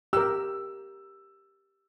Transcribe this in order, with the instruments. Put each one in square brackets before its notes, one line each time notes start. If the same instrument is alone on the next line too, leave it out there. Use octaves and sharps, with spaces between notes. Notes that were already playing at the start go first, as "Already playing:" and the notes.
[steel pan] G4 A#4 [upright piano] E6